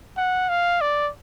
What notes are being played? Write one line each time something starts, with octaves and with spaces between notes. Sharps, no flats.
F#5
F5
D5